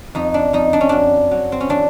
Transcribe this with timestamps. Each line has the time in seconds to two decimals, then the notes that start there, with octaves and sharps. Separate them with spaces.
0.15 F2 D#4
0.34 D4
0.53 F2 D#4
0.73 D4
0.81 C#4
0.89 F#2 D4
1.31 F#3
1.52 C4
1.60 C#4
1.69 E3 D4